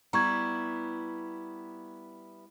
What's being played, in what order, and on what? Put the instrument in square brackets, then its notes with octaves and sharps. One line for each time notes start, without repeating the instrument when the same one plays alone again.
[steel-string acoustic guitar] G3 B3 E4 [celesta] A#5 C#6 G#6